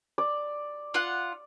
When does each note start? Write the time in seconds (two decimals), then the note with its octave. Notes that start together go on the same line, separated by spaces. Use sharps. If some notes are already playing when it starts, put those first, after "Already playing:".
0.18 D5
0.94 F4 F#5